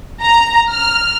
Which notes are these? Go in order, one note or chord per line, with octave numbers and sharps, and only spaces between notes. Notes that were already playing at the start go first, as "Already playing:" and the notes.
A#5
F6